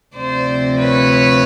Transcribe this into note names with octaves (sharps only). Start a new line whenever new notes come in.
D2 C3 F3 C5 D5
B4 C#5